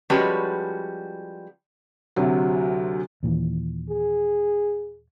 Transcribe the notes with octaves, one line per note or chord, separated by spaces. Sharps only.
F3 G3 G#3 C#4 F#4 B4
D2 C3 F#3
D#2 A#2 E3
G#4